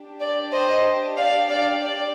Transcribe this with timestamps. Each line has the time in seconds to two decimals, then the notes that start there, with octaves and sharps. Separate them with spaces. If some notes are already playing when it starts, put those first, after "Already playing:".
Already playing: D4 G4
0.20 D5
0.52 C5 D#5
1.17 D5 F5
1.49 D5 F5
1.82 D5